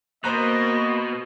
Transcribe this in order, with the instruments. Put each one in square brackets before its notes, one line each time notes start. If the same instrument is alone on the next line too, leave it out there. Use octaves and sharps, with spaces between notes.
[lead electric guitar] B2 [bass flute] A#3 [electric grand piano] C5 A#5 F#6 [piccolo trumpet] D#5